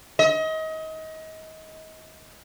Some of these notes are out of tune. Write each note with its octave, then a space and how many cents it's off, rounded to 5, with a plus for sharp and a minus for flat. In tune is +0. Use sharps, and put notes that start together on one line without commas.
D#5 +30